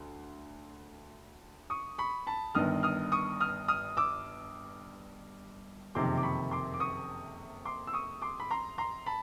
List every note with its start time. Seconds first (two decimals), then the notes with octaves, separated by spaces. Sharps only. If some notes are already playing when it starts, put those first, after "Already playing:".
Already playing: D2
1.70 C#6 D#6
1.98 B5 C#6
2.27 A5 B5
2.55 G1 G2 D#3 D#6 F6
2.83 D#6 F6
3.12 C#6 D#6
3.40 D#6 F6
3.68 D#6 F6
3.97 D6 E6
5.95 F#1 F2 C3 D#3 C6 D6
6.17 D6
6.23 B5 C#6
6.51 C6 D6
6.74 D6
6.80 C#6 D#6
7.65 C6 D6
7.87 E6
7.93 C#6 D#6
8.22 C6 D6
8.40 B5
8.51 A#5 C6
8.78 A#5 C6
9.06 A5 B5